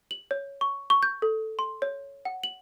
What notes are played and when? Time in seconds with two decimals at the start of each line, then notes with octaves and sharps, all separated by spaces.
0.11 F#7
0.31 C#5
0.61 C#6
0.90 C#6
1.03 G6
1.22 A4
1.59 C6
1.82 C#5
2.25 F#5
2.44 F#7